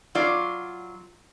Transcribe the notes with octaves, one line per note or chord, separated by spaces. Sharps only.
F#3 F4 D5